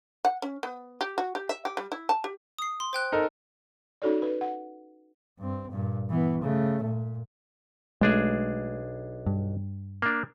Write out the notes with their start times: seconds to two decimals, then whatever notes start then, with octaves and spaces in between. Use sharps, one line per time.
0.25 F#5
0.42 C#4
0.63 B3
1.01 G4
1.18 F#4
1.35 G4
1.49 E5
1.65 G4
1.77 G3
1.92 E4
2.09 A5
2.24 G4
2.59 D#6 C7
2.80 C6
2.93 C5 G5 F#6
3.12 D#4 A4 A#4
4.02 C#4 D#4 F#4 A4 C#5 D5
4.22 B4
4.41 F#5
5.39 G2 C4
5.70 G2 A#2
6.10 E3 B3
6.42 C#3 A3
6.82 A#2
8.01 B1 G#3 A3 D4 G#4
9.26 G2
10.02 A#3 D4